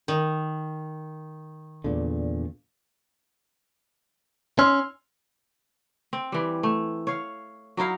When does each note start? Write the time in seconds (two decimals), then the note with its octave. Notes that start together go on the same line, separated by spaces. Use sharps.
0.08 D#3
1.84 E2 A#2 D3
4.59 C#4 C6 E6 F6
6.13 C4
6.32 E3 G3
6.63 A3
7.07 C#5 F5
7.77 F#3 D#4 E4 F5